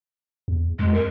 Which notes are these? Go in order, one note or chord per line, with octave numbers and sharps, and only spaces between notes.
E2
F2 G#3
A#4